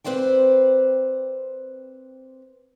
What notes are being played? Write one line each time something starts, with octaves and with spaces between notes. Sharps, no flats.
C4 B4 C5 D5 G5